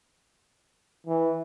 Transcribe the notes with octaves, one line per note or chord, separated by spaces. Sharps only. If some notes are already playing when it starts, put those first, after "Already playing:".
E3